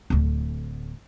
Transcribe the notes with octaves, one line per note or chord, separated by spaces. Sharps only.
D1 D2